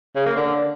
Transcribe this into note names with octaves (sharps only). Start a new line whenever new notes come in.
C#3
A#3
D3